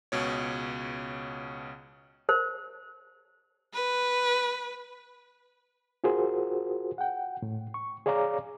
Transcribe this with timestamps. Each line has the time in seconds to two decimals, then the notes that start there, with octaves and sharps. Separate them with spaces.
0.12 C#2 B2 C#5
2.29 A#4 C5
3.73 B4
6.04 F4 F#4 G#4 A#4 C5
6.98 F#5 G5
7.42 A2
7.74 C#6
8.06 G#4 C#5 D5 F5 A#5 D6